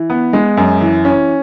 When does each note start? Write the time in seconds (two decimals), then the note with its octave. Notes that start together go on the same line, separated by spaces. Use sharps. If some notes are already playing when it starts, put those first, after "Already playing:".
Already playing: E3
0.10 B3
0.33 G#3
0.57 F#2
0.80 E3
1.05 C#4